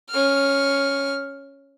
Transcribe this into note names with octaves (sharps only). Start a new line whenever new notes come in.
C#4 F6